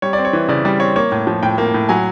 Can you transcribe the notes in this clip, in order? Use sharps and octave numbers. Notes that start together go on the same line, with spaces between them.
G3 C#5
D5
C4
C#5
E3
C#3 D5
G3 D5
C4 C#5
A#3 C#5
A2
F3
A2 G5
A#3
A2
F#3 G#5